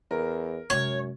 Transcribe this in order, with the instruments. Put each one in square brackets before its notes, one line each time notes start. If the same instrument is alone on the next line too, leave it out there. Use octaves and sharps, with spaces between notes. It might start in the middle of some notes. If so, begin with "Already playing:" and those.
[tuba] E2 [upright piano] A#4
[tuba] F#2 [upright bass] C3 G#3 [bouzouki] C#5